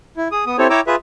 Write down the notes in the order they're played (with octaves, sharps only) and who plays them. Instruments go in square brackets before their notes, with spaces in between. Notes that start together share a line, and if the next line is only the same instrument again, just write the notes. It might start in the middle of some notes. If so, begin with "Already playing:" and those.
[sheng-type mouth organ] E4
G#4 D#6
B3 D#6
C4 E4 G4 A4 C5 C#5
E4 C#5 G5 A#5 D6 E6
F4 G#4 B4 E5